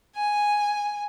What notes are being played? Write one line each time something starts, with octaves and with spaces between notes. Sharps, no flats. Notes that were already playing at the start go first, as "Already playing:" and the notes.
G#5